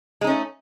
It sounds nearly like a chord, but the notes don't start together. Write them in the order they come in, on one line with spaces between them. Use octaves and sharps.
G#3 D#4 C#4 A3